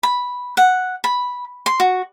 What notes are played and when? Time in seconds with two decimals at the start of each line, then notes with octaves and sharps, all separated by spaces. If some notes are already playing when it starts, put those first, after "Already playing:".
0.03 B5
0.57 F#5
1.04 B5
1.66 C6
1.80 F#4